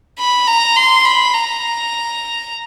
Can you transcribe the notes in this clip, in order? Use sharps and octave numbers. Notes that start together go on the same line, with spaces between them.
B5
A#5
C6
B5
A#5